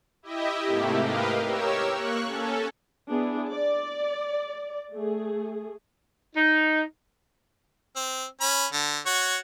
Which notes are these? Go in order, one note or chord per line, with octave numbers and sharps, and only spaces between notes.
E4 G4 D#5 E5
G#2 C3 A3 A#3 E4 G4
G4 A#4 B4 D#5 F5
G4 A#4 C#5 E6
A#3 C#6 F#6
C#4 A4
B3 D4 E4 G#4
D5
A3 G#4
D#4
C4
C#4 B5
D3
F#4 C#5